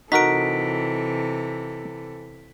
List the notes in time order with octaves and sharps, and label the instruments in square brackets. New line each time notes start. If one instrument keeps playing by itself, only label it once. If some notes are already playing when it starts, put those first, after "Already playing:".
[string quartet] C3 E3 A4 [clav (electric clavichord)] D#4 F#4 A#4 [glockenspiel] B6 D7